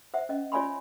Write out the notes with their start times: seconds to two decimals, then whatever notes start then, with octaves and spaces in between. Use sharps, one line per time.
0.14 C5 E5 F#5
0.29 C#4 D#5
0.52 F4 C#5 D5 G#5 B5 C6